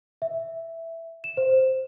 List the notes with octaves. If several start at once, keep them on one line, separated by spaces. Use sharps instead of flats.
E5
E7
C5